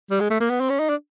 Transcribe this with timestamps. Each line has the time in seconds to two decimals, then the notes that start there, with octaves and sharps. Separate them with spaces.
0.11 G3
0.21 G#3
0.30 A3
0.40 A#3
0.50 B3
0.60 C4
0.70 C#4
0.80 D#4
0.89 D4